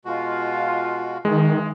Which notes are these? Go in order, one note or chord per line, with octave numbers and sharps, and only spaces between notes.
B2 G#3 F4 F#4
G2 D#3 E3 G#3